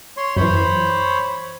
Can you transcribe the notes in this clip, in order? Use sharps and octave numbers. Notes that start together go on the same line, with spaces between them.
C#5 C6
F#2 E3 C5 C#5 B5